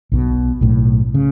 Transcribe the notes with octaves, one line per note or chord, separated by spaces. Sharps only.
B1 B2
B1 A2
C#3